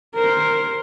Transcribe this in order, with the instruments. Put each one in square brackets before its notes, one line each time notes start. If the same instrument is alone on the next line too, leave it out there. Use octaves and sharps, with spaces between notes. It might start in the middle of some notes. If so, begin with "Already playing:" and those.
[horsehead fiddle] A#4 C5